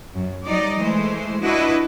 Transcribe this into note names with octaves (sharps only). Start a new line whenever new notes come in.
F#2
F#3 G3 D#4 D5 D#5
E3 G#3 A3 C5
D4 E4 F#4 B4 D#5